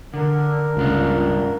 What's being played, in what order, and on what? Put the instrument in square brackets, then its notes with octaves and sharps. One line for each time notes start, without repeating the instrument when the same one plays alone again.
[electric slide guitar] D3 [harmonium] A#4
[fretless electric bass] C#2 [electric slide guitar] G2 D4 F4